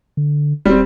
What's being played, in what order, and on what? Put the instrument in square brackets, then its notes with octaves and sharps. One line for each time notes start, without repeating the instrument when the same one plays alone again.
[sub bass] D3
[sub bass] D#1 [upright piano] G3 C4